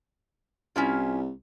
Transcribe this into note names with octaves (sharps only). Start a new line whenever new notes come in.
C2 C#4 E4 F4